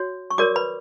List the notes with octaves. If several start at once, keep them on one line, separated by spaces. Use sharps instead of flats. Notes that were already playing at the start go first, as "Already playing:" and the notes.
Already playing: F#4 C#5
C#6
F#4 A#4 C#5 D5 D6
B4 B5